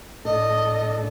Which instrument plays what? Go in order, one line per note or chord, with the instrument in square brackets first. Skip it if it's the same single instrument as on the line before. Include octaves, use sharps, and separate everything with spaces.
[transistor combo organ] A2 D4 A4 [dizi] D#5